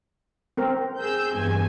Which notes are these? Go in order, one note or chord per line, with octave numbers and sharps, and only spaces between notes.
C4 A#4
G#4 E6 G6
E2 G2 G#5